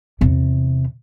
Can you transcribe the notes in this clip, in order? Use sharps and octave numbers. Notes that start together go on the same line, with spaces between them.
E2 C3